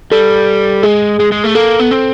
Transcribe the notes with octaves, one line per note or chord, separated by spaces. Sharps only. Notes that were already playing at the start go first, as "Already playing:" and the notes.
G3 A4
G#3 G#4
G#3
G#3
A3
A#3 A4
B3
C4